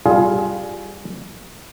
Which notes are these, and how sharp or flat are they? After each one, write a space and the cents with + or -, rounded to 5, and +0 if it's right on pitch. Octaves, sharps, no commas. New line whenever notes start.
G3 +0 F4 +0 G#4 +20